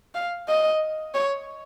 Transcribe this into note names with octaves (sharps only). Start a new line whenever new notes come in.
F5
D#5
C#5